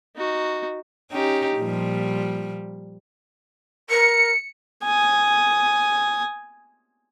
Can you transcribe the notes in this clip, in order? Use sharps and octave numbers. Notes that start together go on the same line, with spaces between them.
D#4 F#4
C#4 D#4 G4
A#2 F3 G3
A#4 C#7
G#5 D#6